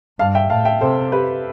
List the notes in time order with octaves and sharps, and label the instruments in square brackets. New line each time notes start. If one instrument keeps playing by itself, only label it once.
[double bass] G2 [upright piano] F5 A5
[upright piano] E5 G5
[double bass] A2 [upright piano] F5 A5
[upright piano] E5 G5
[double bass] C3 [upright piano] A4 C5
[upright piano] G4 B4